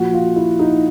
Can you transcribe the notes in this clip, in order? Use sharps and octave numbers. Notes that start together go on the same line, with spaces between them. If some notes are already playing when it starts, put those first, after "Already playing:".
Already playing: A#2 F3 F#4
F4
E4
D#4